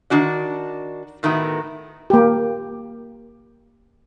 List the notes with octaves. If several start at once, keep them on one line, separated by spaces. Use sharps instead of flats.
D#3 D4 F#4 D5
A2 D#3 A3 B3 F#4
A#3 G4